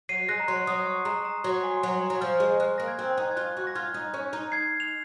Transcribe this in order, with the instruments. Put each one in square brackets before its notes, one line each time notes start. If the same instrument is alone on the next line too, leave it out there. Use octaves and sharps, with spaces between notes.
[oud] F#3 [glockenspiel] C7 D#7
[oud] G#3 [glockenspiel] F#6 A#6
[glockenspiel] A#5
[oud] F#3 [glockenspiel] C6
[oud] F#3 [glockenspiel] D#6
[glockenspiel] C#6
[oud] G#3 [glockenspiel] A#5
[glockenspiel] A#5
[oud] F#3 [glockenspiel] C6
[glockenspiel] G#5
C6
[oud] F#3 [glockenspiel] A#5
[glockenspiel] A#5
[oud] F#3
[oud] F3 [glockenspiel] F6
[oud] G#3
[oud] G#3 [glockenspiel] F#6
[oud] A#3 [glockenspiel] A#6
[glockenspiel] G#6
[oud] C4 [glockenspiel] F#6
[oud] D#4
[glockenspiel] G#6
[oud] F4 [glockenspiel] F#6
[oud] F#4
[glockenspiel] A#6
[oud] F4 [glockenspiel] F6 G#6
[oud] D#4
C#4
D#4
[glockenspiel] G#6 C7
F7